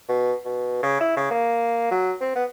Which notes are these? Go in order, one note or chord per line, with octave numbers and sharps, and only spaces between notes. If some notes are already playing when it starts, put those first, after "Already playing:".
B2
B2
C#3
E4
C#3
A#3
F#3
C4
B3